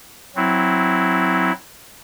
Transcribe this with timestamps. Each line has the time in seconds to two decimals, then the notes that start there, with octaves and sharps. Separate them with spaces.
0.35 F#3 C4 E4